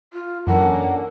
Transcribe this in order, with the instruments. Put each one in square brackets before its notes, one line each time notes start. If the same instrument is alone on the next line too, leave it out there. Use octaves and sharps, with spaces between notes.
[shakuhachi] F4
[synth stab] F#2 E3 [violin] A#3 [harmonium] C#4 D4 A4 [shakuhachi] F#5